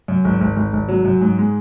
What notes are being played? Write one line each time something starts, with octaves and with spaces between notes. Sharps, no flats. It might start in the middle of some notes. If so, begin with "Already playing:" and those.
F#2
G#1
G#1
G#1
G#1
F#3
F#2
G#2
G#3